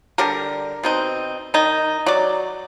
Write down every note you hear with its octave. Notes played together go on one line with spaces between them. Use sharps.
D3 G3 G4 A#4
B2 C4 D#4
D#3 D#4
F#3 D5